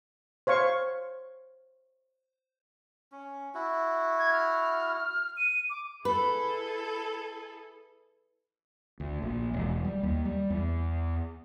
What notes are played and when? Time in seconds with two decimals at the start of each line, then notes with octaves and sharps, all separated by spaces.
0.47 C5 C#5 F5 C#6
3.12 C#4
3.54 E4 F#4
4.19 G#6
4.33 F6
5.37 D#7
5.70 D6
6.05 E4 G#4 A4 B4
9.00 D2
9.22 A#1
9.53 E1
9.85 G3
10.03 D#2
10.25 G3
10.50 E2